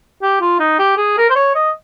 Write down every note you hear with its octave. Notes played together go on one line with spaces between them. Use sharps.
G4
F4
D#4
G4
G#4
A#4
C5
C#5
D#5